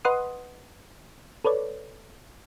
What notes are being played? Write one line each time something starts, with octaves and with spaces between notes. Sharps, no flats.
B4 D#5 F#5 C6 D#6
A4 B4 C#5 D5